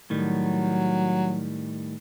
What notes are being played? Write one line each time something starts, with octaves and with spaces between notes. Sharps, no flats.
A2 D#3 F#3 G3